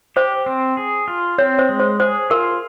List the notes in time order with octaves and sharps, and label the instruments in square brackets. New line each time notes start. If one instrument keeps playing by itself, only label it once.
[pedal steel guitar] G4 [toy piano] C5
[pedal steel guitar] C4
G#4
F4
[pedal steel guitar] C4 [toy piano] C#5
[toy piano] C5
[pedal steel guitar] G#3
[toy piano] C5
[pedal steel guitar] G#4 [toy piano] C5
[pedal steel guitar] F4 [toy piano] A#4